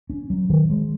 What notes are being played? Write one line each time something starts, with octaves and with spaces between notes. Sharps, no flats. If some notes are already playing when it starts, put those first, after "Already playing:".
C#4
F#3
D#3
G#3